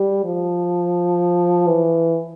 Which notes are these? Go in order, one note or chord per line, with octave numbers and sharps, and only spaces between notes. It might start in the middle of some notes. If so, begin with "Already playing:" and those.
Already playing: G3
F3
E3